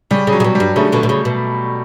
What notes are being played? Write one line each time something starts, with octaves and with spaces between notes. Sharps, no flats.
C#3 G3
C#3
F#3
C#3
B2
G3
G2
C#3 A3
B2 D3
B2
C#3
B2